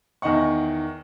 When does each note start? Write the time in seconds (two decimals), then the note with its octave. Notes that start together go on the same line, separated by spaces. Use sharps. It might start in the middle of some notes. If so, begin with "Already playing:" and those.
0.22 E2 D#3 D#5 F#5 C#6